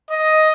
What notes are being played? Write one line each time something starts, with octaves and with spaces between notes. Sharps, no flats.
D#5